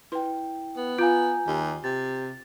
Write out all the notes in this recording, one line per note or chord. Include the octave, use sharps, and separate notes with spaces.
E4 B4 G5 C6
B3
F4 F5 G#5 A#5 G6
D#2 G4
C3 A6